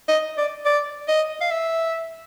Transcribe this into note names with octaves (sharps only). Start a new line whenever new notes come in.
D#5
D5
D5
D#5
F5
E5